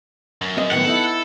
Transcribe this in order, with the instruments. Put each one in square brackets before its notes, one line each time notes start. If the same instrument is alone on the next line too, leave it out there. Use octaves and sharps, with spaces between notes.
[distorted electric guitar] F#2
[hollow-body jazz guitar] C4 D#5
[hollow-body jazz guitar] A2 D#3 B3 [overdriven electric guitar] F#5
[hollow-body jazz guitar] B3 D#4 E4 [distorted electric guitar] A4